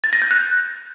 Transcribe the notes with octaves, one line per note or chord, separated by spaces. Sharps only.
A6
A#6
G6
F#6